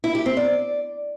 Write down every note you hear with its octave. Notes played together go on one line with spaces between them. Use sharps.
E4
G4
C4
D5